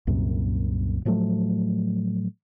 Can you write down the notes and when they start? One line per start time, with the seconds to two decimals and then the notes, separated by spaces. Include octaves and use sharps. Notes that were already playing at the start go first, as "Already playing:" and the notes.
0.07 C2 F#2 A#2
1.05 A2 F3 F#3 A3